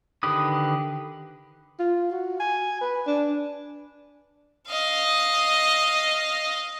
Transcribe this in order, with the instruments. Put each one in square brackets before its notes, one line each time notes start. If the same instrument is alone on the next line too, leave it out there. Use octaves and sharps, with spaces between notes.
[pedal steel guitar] D3 D#3 G4 B4 D#6
[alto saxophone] F4
F#4
G#5
B4
D4
[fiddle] D#5 F5